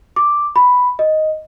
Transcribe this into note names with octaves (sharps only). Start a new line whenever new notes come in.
D6
B5
D#5